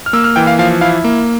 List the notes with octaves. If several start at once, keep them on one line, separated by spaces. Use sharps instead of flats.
F6
A#3 E6
F6
E3 G5
F5
F3 F5
E4 F5
A#3